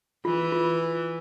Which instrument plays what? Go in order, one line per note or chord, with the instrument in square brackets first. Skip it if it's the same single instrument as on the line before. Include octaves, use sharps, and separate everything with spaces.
[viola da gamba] E3 [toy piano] F4
[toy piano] F4